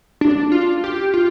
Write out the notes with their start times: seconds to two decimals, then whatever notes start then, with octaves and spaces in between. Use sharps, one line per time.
0.21 D4
0.52 F4
0.84 G4
1.14 F4